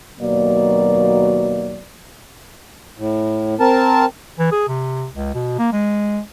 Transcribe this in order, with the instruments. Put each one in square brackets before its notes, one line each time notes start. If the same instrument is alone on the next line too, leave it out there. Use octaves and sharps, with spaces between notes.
[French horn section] D#2 B2 F#3 A#3 D5
[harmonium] A2
C4 A#4 A5
[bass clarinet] E3
G#4
C3
C#2
B2
A#3
G#3